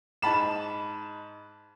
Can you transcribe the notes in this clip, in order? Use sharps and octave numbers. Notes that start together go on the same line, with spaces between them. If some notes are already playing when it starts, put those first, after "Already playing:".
G#2 A5 B5 E7